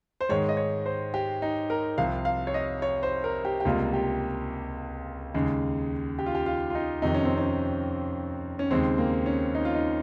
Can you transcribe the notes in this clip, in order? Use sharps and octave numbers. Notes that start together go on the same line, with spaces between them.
C5
G#2 D#3 G#3 C#5
D#5
C#5
C5
G4
D#4
A#4
C2 C3 F3 F5
F5
C#5
D#5
C#5
C5
A#4
G4
G4
C#2 C3 G3 A#3 F4
G4
D#2 C#3 G#3
G4
F4
G4
F4
F4
D#4
F2 C3 D#3 D#4
C#4
C4
C#4
C#4
D#2 C#3 G#3 C4
A#3
C#4
D#4
F4
D#4